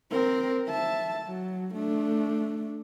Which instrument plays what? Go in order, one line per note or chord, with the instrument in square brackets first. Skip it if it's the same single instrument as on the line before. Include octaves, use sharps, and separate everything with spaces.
[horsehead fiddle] C4 A#4
E5 A5
F#3
A3 D4